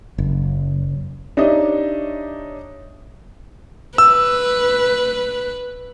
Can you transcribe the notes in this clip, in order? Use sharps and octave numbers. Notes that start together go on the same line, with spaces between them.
F#1
D4 D#4 G4 C#5 D#5 E5
B4 E6